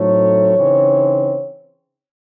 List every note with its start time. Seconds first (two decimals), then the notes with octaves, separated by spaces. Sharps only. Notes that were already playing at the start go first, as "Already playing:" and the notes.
Already playing: A2 F#3 A3 C4 D#4 C#5
0.56 C#3 E3 C4 D#4